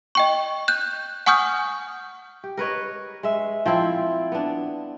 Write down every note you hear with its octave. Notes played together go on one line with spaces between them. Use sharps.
D#5 G5 C#6
F#6 G6
F#5 G#5 C#6 D#6 F6 G6
G4
A#4 B4 C#5 D#5
G#3 E5
F3 C4 E4
B3 D4